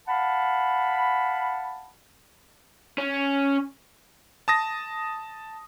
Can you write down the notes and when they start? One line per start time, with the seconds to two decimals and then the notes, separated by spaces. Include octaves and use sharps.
0.08 F5 F#5 A5 B5
2.98 C#4
4.48 A5 D#6 A#6